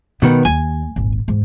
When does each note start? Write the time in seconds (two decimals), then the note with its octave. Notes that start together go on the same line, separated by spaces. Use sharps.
0.22 B2 D#3 E3 B3
0.45 D#2 G#5
0.96 D#1 G#1
1.28 E2 G#2